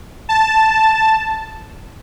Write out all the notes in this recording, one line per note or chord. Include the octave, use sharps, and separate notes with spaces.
A5